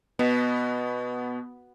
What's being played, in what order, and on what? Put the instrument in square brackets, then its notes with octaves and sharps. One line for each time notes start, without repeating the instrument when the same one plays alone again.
[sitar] B2 [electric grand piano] B3